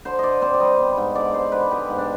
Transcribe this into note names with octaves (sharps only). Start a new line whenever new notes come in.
D3 C5
D3 D5 D#5
C4 C5
D5
G3 D#5
B3
G#2
D3 D5
G#3 C5
D3 B4
B3 G4
G#2
D4